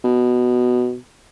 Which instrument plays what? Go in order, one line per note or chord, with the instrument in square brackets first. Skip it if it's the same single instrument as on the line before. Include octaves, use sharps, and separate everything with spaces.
[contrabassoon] B2